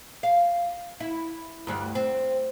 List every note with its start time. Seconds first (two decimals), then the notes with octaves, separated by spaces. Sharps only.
0.23 F5
1.00 E4
1.67 D2 G2 G3
1.95 C4